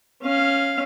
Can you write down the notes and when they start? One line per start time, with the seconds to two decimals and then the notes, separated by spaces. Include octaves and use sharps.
0.22 C#4 F5